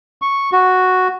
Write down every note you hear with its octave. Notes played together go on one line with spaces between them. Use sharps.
C#6
F#4